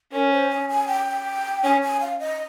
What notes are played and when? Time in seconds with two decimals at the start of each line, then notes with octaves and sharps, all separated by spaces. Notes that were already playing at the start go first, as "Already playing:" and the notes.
0.11 C#4 A#4
0.31 C5
0.49 G#5
0.69 G#5
0.88 G5
1.63 C#4 G#5
1.82 G#5
2.01 F5
2.19 D#5